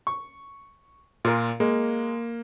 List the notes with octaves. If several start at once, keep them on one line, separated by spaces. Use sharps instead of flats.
C#6
A#2 F4 A#4
G#3 A#3